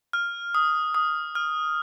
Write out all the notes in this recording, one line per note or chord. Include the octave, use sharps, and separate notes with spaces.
F6
D#6
D#6
F6